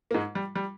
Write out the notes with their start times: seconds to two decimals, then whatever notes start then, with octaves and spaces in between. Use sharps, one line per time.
0.11 A#3
0.14 G#2 G#3
0.35 G3
0.55 G3